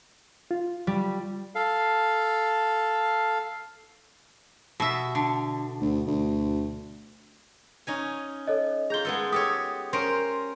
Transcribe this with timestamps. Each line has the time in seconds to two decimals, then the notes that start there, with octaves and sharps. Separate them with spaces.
0.51 F4
0.87 G3
1.55 A4 F5
4.80 B2 E5
5.15 D3
5.81 D2
6.07 D2
7.87 C#4 D#4 G#5
8.47 A4 C#5 D#5
8.90 F4 G#4 A#5 G6 G7
9.05 G#3 B3 A4
9.32 G4 A4 C#5 D#6
9.93 C#4 A#4 C5 C6 D7